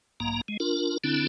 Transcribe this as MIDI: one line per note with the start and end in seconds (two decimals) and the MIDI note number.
0.20 0.41 35
0.20 0.41 44
0.20 0.41 58
0.20 0.41 82
0.48 0.57 56
0.60 0.98 62
0.60 0.98 65
0.60 0.98 70
1.04 1.27 50
1.04 1.27 60
1.04 1.27 62
1.04 1.27 64